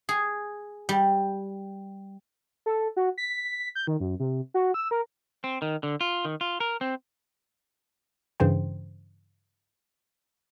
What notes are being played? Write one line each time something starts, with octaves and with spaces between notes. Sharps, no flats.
G#4
G3
A4
F#4
B6
G6
D#3
F#2
C3
F#4
E6
A#4
C4
D#3
D3
F4
D#3
F4
A#4
C4
G2 C#3 E3 C5 G5